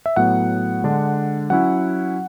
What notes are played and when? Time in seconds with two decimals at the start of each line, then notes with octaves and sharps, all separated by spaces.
0.06 E5
0.16 A2 F#3 B3 F#5
0.84 D3 G#3 D4
1.50 F#3 C#4 E4 F#5